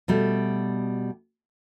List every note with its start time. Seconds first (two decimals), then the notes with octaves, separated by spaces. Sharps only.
0.08 B2 G3 A3